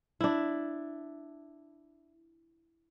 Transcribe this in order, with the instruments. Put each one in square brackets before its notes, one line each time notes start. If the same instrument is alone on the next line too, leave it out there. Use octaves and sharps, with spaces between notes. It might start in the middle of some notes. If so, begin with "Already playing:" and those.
[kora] D4 E4